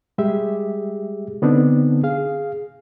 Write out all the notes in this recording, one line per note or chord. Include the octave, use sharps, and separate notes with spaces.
G3 G#3 G4 G#4 E5
D3 B3 C4 D4 D#4
G#4 F5